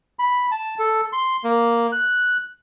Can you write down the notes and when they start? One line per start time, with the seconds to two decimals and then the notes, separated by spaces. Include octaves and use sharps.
0.19 B5
0.52 A5
0.79 A4
1.13 C6
1.44 A#3
1.92 F#6